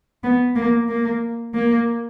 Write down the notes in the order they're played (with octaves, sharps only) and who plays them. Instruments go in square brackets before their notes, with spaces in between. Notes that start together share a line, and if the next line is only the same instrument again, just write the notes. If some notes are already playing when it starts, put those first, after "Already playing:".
[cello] B3
A#3
A#3
A#3